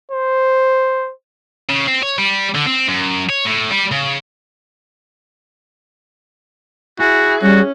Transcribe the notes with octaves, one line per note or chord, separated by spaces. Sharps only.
C5
C#3
C4
C#5
G3
D3
C4
F#2
C#5
A2
G3
C#3
E4 F#4 G#4
G3 C#4 F#4